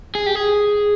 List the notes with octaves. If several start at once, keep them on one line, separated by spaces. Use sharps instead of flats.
G#4
G4
G#4